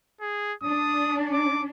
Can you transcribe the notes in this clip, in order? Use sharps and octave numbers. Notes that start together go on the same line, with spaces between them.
G#4
D4 D#6
D6